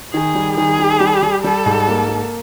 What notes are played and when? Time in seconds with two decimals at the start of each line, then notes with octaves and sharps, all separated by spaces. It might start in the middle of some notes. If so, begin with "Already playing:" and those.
0.13 D#3 G#4
0.35 G3
0.57 D#3 G#4
0.79 G3
1.00 G3
1.23 G3
1.44 G3 A4
1.66 G#2
1.88 A#3
2.08 A#3